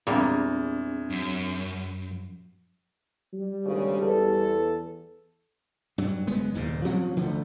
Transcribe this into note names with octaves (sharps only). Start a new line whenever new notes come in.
E2 A#2 G3 G#3 C4 D4 A#5
F#2
G3
G#1 D2 C#3
E2 A4
G2 F#3
F#1 G#3 B3
D#1 D#2 G#2 C#3
F3 F#3 C4 C#4
D2 D3 F3 A3